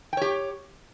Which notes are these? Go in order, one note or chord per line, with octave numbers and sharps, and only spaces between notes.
G4 C#5 G5